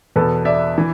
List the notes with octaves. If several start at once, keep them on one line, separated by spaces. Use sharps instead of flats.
E2 B2 A4 B4
D5 E5
E3